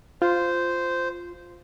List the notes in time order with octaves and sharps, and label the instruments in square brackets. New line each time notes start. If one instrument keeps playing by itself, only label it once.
[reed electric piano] F4 [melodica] C5